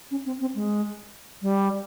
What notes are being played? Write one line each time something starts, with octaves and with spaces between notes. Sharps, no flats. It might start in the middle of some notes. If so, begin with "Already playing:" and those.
C#4
C4
C4
G#3
G3